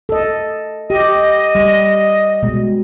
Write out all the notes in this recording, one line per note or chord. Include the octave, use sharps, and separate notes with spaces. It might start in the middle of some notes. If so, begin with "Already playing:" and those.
A4 D#5
G4 D#5
G3
B2 G#3